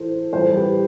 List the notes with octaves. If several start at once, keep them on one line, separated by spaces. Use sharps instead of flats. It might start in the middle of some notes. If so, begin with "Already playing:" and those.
Already playing: A2 E3 A4 C5
A2 E3 G3 A4 C5
G4 B4